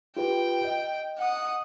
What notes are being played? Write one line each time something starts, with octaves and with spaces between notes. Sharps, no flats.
F4 G4 B4 G5
D#5
F#5 D#6